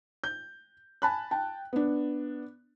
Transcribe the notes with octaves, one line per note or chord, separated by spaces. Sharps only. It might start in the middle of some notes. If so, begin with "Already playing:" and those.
G6
G#5 A5 B5 F#6
G5 A5
B3 D4